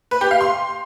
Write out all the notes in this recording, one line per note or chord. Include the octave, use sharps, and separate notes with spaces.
B4
G4
F5
C6